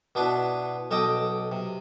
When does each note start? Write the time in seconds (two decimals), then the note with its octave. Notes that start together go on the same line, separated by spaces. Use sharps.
0.15 B2 B3 D4 E4 B4
0.91 B1 A4 D#5 G5 D6 D#6
1.52 C3